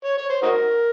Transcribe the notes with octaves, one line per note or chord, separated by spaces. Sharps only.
C#5
C#5
C5
D#4 F#4 A#4